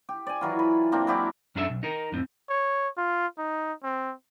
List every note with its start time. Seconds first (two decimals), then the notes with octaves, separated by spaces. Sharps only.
0.09 G4
0.26 D5 G#5
0.41 E3 F#3 F4
0.59 B5
0.92 A#3 C4 D4
1.07 F#3 E4 G4 D5
1.55 F#2 C#4 D4 E4 A4 E5
1.70 B1
1.83 D#4 A#4
2.12 F2 A2 C4
2.49 C#5
2.97 F4
3.38 D#4
3.84 C4